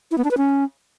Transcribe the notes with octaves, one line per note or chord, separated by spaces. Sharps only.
E4
B3
D4
B4
C#4